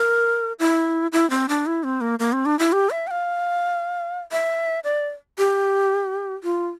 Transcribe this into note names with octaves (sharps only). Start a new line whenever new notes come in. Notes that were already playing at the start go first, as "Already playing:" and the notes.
Already playing: A#4
E4
E4
C4
D4
E4
C4
A#3
A#3
C4
D4
E4
G4
E5
G5
F5
E5
D5
G4
F4